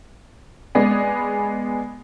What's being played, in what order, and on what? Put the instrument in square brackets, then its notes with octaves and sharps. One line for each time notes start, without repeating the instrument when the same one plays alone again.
[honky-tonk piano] G#3 B3 G#4 B4 D5